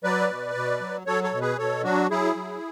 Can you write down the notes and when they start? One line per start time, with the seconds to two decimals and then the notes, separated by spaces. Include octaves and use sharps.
0.04 F#3 B4 D5
0.30 B2
0.55 B2
0.81 F#3
1.07 F#3 A4 C#5
1.24 A4 C#5
1.33 B2
1.41 G#4 B4
1.58 B2 A4 C#5
1.84 F#3 D4 F#4
2.10 F#3 E4 G#4
2.36 F#3